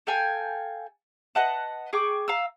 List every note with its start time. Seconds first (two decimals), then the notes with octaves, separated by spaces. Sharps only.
0.07 A4 F5 G5 G#5
1.35 B4 D#5 F#5 A5
1.93 G#4 G5 C#6 D6
2.28 F5 A#5 E6